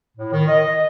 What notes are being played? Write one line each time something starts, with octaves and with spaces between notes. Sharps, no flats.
A2
D#3
D#5
D#5